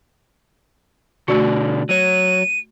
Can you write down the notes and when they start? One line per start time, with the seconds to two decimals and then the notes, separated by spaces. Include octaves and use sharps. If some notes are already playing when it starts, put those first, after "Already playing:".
1.28 B2 D3 A3 F#4 D5
1.89 F#3 C#5 D#7